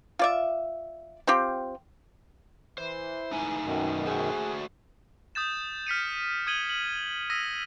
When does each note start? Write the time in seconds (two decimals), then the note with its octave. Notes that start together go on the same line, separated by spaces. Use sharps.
0.19 F4 D5 E5
1.27 C4 F4 G4
2.78 E3 C5
3.32 A3 D#4 G#5
3.65 F#2 B2 D#3
4.07 A3 F#4 G#4 C5
5.35 D#6 G6 A6 E7
5.87 F6 B6 C#7 D#7
6.47 D#6 G#6 D#7 F#7 G7
6.69 F#7
7.30 D#6 E6 A#6 B6 D#7